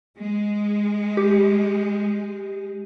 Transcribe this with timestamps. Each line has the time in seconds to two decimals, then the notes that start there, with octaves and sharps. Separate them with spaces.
0.19 G#3
1.17 G4